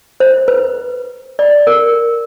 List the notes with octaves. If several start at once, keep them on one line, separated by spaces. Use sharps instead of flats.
C5
B4
D5
A#4